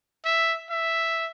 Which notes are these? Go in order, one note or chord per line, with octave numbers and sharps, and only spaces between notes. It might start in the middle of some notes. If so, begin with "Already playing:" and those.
E5
E5